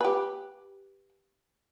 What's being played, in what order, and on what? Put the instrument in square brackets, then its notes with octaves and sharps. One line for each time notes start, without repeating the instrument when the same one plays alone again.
[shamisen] G4 B4